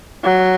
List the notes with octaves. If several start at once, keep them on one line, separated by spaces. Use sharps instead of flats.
F#3